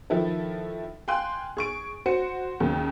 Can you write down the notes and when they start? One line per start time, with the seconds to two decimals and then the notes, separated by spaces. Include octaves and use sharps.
0.10 D#3 F3 E4 A4 B4
1.08 F5 G5 G#5 C6 F#6
1.57 G#4 C#6 D7
2.06 F#4 C5 C#7
2.60 D#2 C#3 A#3